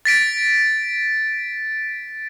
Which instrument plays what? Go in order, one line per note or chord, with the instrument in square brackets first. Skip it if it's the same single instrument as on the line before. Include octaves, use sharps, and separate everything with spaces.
[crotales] A6 B6 D7